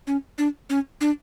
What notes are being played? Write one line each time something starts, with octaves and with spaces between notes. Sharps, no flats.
C#4
D4
C#4
D4